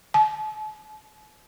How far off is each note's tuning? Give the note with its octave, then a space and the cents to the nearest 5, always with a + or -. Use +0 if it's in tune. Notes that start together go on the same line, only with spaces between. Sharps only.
A5 -45